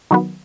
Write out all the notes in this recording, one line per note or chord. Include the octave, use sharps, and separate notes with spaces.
D#3 F#3 B3